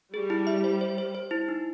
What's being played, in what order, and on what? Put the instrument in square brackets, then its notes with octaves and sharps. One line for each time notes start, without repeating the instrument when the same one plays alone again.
[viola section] G3 [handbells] G#4
[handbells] E4
E5
C5
C5
C5
C5
E4
D#4